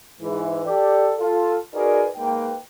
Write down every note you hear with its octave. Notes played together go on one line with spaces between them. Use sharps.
G#2 E3
G4 A4 D5
F4 A4
D#4 F#4 G#4 A#4 B4 D5
G#2 A#3 B4 G5